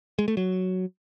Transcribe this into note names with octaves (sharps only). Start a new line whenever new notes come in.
G#3
A3
F#3